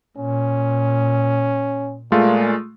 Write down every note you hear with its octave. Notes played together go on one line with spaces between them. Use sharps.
A#2 C#4
A#2 G#3 A3 F4